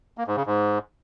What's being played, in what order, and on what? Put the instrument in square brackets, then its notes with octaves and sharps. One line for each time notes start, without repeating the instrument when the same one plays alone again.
[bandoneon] A#3
G#2
C#3
G#2